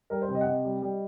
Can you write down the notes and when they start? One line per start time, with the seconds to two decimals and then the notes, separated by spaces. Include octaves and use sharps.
0.10 G3 A#4
0.22 C5
0.28 C3
0.35 D#5
0.41 F#5
0.46 C3 D#5
0.64 G3
0.82 G3